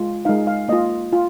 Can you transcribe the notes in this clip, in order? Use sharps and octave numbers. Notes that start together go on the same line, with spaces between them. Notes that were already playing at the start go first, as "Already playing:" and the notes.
Already playing: G#3 F4
G#3 D#4 F5
F5
A#3 F4 D#5
F4